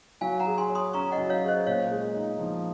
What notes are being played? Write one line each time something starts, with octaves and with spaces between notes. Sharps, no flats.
F#3 F5 G#5
F#5 A#5
G#4
G#5 C6
C#5
C6 D#6
C#4 A#5 C#6
D#5 F#5
F#3
C#5 F5
G#4
C5 D#5
A#2 C#5 F5
G#3
D#4
F3